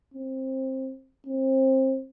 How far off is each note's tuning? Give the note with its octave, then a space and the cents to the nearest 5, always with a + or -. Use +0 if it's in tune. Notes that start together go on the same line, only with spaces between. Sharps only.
C4 +15
C4 +25